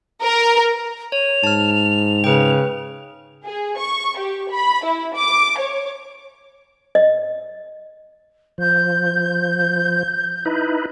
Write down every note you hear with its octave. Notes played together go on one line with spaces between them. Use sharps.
A#4
C#5 F7
G#2 A5 F6
C#3 B4 G5
G#4
C#6
G4
B5
E4
D6
C#5
D#5
F3 G6
D#4 E4 B4